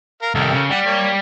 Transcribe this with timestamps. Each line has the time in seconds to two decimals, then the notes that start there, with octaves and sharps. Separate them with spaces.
0.22 A#4 F5
0.35 C2 D#3 G4 A4 A#4
0.54 C#3
0.70 G3 F#5
0.85 A#3 C#5